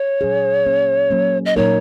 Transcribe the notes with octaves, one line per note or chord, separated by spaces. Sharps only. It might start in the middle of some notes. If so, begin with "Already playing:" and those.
Already playing: C#5
A#2 F#3 C#4 G#4
F#3 A#3 C#4
F#3 A#3 C#4
D#5
A#2 F#3 A#3 D#4 A#4 C#5